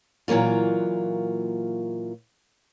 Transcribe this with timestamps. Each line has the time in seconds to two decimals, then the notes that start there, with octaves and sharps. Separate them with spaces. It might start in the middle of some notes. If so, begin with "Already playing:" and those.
0.28 A#2 E3 F#3 A#3 F4